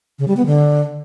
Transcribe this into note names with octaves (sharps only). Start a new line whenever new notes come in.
C#3
G3
B3
D3